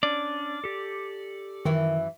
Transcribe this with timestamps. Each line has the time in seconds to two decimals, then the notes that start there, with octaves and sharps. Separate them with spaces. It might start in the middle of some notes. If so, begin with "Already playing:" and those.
0.03 C#4 D4 D5
0.64 G4 A4
1.65 F#2 D#3 E3 E4